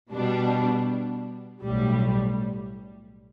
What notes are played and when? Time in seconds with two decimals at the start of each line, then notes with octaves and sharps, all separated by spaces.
0.12 B2 G3 D4
1.62 B1 A2 G3